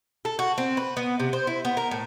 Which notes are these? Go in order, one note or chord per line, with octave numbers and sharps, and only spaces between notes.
A4
F#4
C4
B4
B3
C3
C5
E4
B3
A#4
A2